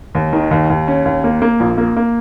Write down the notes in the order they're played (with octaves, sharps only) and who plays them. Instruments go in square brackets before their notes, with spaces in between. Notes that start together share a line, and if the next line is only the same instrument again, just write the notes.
[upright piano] D#2
D#3
D#2
D#2
C#4
D#2
A#3
A#3
A#1
A#3
A#3